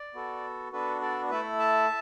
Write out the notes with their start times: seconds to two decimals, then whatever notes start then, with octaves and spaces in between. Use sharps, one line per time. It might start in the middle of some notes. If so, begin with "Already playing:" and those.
Already playing: D5
0.14 B3 F#4 A4
0.72 B3 D4 F#4 A4 B4
1.01 A4 D5
1.30 A3 E4 A4 B4 E5
1.59 E5 A5